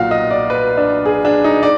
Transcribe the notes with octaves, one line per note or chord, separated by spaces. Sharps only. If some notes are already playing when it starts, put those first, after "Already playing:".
Already playing: B1 A#2 F#3 A#3 F4 F#4 F5
D#5
D5
B4
D4
G#4
D4
D#4
D5